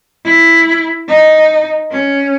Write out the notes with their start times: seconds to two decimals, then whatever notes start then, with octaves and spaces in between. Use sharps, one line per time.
0.25 E4
1.08 D#4
1.91 C#4